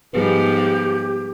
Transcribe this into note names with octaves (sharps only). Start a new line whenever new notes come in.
G#2 F3 G3 B3 G4 G#4 B4